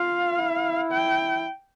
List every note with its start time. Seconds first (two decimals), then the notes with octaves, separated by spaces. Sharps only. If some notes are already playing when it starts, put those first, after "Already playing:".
Already playing: F4 F5
0.39 E4
0.92 G5